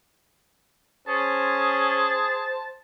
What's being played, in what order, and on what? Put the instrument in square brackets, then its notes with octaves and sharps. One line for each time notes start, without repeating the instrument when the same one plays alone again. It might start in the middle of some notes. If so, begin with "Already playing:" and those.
[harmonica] C#4 [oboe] G#4 [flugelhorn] C5 [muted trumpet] A5